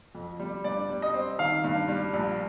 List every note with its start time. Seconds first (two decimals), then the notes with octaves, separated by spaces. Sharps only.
0.15 F2
0.40 G3
0.64 G2 D5
0.90 G3
1.02 D#5
1.14 C4
1.39 D#3 F5
1.64 G2
1.88 G3
2.14 A#1